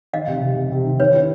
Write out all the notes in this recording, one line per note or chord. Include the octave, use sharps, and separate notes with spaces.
D#3 D#5 F5
C3
C3
C3
C3
D#3
D#3 B4 C#5
E4